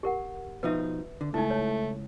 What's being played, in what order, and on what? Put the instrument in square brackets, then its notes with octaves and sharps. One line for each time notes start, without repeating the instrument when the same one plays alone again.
[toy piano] G4 A#4 F#5
[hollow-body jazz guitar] B2 F3 D#4 [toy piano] B4 E5
[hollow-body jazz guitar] D3
[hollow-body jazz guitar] C#2 [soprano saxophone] A3 [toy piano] D#4 E4
[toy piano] C#5